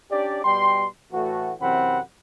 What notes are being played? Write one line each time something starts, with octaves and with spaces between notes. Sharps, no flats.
C#4 D4 G4 D5
B2 G3 G5 C6
A2 E3 A3 F#4
F#2 C3 E3 C4 F#5 B5